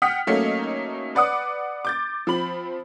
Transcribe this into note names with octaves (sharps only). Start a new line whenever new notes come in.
F#5 G5 D#6 F6 B6
F#3 A3 A#3 C#4 D#4
B4 D5 F#5 D6 D#6
D6 G6 A6
F3 C4 B5 F#7